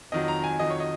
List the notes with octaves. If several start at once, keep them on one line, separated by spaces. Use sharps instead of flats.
F2 D#3 F#3 D#5
A#5
G#5
F2 D#3 F#3 D#5
C#5
D#5